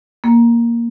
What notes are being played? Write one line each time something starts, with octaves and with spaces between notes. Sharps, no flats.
A#3